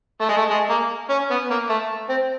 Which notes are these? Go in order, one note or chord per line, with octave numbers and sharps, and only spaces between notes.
A3
G#3
A3
G#3
A#3
C#4
B3
A#3
A3
C4